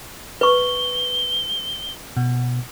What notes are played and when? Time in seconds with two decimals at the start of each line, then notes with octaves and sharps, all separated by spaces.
0.41 B4 C#6 G7
2.17 B2